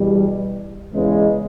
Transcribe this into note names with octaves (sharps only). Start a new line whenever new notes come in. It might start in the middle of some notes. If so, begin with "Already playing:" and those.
Already playing: E2 B2 G3
E2 C#3 E3 G#3